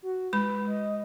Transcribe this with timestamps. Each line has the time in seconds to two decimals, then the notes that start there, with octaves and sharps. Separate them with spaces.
0.02 F#4
0.33 G#3 B4 B5
0.67 D#5